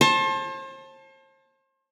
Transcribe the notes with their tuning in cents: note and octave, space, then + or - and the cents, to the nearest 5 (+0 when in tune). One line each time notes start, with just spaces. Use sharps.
C5 +40 A5 +0